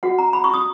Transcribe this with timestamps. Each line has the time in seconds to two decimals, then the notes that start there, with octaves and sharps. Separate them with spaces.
0.03 F#4 B4 F#5
0.18 A#5
0.33 B5
0.44 C#6
0.54 D#6